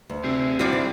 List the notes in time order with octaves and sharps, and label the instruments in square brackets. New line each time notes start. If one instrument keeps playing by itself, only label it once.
[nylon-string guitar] D2
[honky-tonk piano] C3 [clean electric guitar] G4 G#4 E5
[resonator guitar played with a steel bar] A2 G3 D5 [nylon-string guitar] F#4 C5
[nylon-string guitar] D3